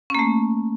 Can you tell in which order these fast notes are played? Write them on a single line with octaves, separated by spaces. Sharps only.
C#4 A#3 A3